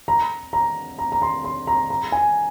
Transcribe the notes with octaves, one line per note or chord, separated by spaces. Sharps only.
A#5
A#5
A#5
A#5
C6
C6
A#5
A#5
G#5